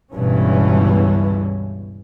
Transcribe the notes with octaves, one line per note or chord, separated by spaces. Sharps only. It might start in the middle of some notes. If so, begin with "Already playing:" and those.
G1 C#2 G2 B2 E3 C#4